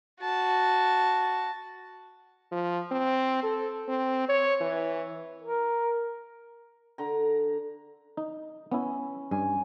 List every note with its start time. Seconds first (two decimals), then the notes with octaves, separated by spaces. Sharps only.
0.21 F#4 A5
2.52 F3
2.91 C4
3.43 A4
3.88 C4
4.29 C#5
4.61 E3
5.42 A#4
6.98 D3 A#5
8.17 D#4
8.71 B3 C#4 E4
9.31 G2 G#5